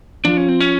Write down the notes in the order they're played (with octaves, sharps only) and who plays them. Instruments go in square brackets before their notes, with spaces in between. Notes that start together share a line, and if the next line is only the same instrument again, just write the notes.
[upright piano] F3 F4 [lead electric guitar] D4
[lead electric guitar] C#4
C4
C#4